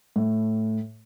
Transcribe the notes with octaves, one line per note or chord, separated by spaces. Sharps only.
A2